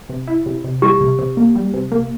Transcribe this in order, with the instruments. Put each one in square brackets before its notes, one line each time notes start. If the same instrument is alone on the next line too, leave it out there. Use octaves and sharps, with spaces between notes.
[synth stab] C3
E4
C3
C3
[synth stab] G3 [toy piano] G4
[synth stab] C3
C3
A#3
G3
C3
A#3